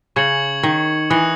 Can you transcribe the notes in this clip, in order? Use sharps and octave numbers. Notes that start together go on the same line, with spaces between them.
C#3 C#6 G#6 C#7 F#7
D#3
E3 D#6 F#6 A#6 C#7 F#7